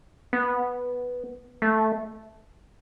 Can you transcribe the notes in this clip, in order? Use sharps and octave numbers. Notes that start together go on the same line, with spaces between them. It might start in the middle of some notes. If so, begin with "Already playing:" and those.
B3
A3